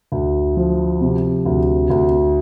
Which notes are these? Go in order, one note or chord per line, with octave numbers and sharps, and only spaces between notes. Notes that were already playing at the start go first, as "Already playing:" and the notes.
D2
F3
C3
D2
D2